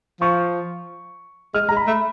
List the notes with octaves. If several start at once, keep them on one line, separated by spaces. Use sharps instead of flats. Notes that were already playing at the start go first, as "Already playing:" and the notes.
F3 C#6
G#3 F6
G#3 A#5
B5
A3